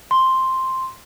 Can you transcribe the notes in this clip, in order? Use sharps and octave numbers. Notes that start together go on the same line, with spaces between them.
C6